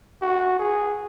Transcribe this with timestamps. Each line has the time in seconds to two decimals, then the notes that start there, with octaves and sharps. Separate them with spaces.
0.22 F#4
0.59 G#4